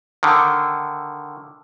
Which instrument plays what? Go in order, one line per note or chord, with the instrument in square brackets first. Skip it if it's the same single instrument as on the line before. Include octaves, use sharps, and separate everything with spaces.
[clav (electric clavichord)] D3 D#3